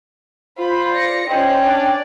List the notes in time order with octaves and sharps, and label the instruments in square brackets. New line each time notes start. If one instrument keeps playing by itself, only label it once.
[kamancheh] F4 [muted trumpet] C5 [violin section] B5
[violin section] D5 A#6 C#7
[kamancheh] C#4 [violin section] D#4 D5 [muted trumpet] C5 [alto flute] G5
[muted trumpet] D4 [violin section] D5